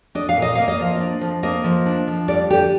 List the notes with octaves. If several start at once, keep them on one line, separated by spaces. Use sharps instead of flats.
D4 D#5
F5
A#2
D#5
A#3 F5
D#5
F3 F5
D4 D#5
F3
A#3 D#5
F3
D4
F3
G3 D5
D3 G4